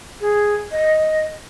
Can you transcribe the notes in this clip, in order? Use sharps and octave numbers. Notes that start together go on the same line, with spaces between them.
G#4
D#5